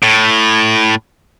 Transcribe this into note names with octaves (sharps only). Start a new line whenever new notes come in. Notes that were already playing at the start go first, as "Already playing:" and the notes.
A2